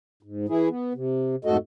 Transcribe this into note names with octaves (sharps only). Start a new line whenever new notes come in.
G#2
E3 E4 G#4
B3
C3
F2 G#2 A3 F#4 A4 D#5